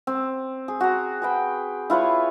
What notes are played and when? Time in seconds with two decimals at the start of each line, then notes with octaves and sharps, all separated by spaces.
0.07 C4
0.68 G#4
0.81 F#4 A#5
1.22 G#4 B4 G5
1.90 E4 F4 B4 C#5